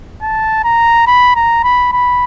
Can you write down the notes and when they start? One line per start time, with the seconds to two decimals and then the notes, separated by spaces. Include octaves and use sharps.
0.22 A5
0.64 A#5
1.07 B5
1.36 A#5
1.64 B5
1.93 B5